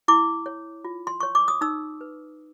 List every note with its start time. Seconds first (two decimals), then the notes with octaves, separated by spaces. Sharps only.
0.08 E4 D6
0.46 C#5
0.84 F4
1.07 C6
1.20 C#5 C#6
1.35 D6
1.48 D#6
1.61 D#4 E6
2.01 B4